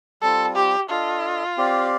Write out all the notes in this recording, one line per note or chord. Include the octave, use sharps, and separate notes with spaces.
G3 C4 F4 A4
G4
D4 F4 A4 D#5
C4 G4 D5 F5